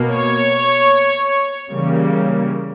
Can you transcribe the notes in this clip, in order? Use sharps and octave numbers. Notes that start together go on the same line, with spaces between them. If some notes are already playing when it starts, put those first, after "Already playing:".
Already playing: B2 A#3
C#5
C#3 E3 G3 A#3